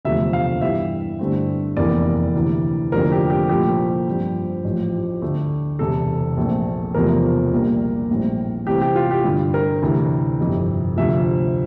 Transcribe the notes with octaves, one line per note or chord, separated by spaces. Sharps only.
E1 D2 C3 F3 A3 E5
F5
G2 E3 G3 E5
G2 D3 A3 C4
F1 E2 E3 A#3 D5
D2 C3 E3
F1 F2 D3 F3 A#3 A#4
G4
G4
C2 A#2 F3 A3 G4
G2 F3 C4
A1 A2 F3
D2 D3 A3
E1 E2 C3 A4
A#1 A#2 A3 C4
E1 E2 C3 F3 A3 A#4
A#1 A#2 G3 A#3
A#1 A2 G3 C4
C2 C3 E3 A3 C4 G4
G4
F4
G4
G2 D3 G3
A#4
D2 C3 E3
G1 F2 C3
D2 C3 F3 E5